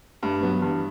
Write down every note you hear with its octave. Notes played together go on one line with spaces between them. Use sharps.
G2 A3
F#3 B3
G2 E3